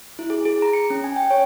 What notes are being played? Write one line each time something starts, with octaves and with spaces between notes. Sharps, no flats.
E4
G#4
G#4
A#5
C#7
C#4
G#5
G5
C#5